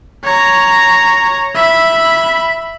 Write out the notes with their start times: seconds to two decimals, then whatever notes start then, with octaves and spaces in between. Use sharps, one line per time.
0.24 C#5 A#5
1.55 E5 B5